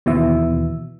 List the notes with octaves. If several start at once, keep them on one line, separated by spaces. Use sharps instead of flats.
D#2 B2 E3 E5